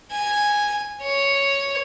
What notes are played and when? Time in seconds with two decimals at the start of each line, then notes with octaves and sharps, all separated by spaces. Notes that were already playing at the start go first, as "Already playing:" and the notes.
0.12 G#5
1.02 C#5